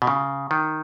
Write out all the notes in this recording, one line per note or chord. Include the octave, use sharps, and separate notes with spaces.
B2
C#3
D#3